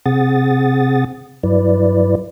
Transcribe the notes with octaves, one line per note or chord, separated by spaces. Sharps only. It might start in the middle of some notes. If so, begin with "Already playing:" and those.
C3 C4 G#4 F#5 D#6 A6
G2 F#3 E4 B4 D5